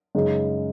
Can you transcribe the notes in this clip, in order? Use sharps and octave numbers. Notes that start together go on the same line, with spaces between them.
F#2 C#3 G#3 D#4